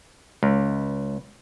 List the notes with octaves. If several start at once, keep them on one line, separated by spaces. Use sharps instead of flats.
C#2